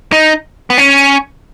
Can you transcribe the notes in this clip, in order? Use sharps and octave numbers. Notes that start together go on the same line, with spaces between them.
D#4
B3
C#4